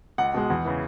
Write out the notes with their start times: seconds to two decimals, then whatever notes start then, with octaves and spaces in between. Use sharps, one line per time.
0.18 C#2 F#5
0.34 B2 G#3
0.50 E2
0.65 C#3 E3